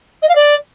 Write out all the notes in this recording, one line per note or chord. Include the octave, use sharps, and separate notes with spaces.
D#5
F5
D5